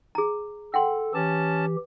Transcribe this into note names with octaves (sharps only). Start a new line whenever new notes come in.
G#4 A#5
A4 F#5 G5 C6
E3 C#4 G4 A5